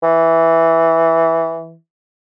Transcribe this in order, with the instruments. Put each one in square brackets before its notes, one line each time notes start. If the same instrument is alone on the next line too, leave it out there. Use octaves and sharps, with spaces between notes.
[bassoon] E3